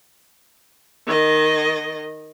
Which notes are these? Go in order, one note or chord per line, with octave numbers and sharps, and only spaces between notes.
D#3 D#5